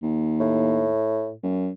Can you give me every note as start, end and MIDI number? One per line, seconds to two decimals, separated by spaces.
0.03 0.89 39
0.40 1.34 45
1.43 1.69 42